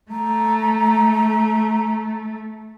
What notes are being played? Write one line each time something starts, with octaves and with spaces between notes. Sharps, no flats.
A3 A#5